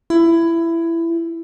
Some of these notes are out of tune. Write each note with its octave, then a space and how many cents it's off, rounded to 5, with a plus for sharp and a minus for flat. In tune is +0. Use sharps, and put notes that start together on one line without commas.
E4 +15